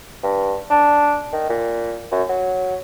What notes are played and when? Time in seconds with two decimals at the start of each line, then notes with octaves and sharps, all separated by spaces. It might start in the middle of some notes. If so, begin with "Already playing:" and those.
0.23 G2
0.70 D4
1.33 D#3
1.49 A#2
2.12 F#2
2.29 F#3